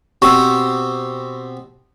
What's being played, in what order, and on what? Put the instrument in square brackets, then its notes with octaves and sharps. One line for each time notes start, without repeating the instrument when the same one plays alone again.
[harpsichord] B2 C4 G4 [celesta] C#6 E6